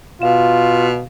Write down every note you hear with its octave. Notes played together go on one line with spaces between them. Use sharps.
B2 F4 F5 E7